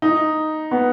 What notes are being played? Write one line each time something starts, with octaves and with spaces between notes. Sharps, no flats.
D#4
B3